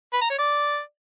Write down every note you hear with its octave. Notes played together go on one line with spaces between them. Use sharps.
B4
A#5
C#5
D5